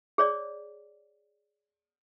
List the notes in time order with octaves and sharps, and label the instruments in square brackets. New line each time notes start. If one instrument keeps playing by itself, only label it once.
[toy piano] G#4 C#5 D5